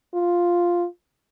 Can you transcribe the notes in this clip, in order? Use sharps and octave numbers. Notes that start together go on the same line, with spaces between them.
F4